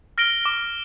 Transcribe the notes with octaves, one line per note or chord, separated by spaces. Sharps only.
F6 A#6 D7 G7
D6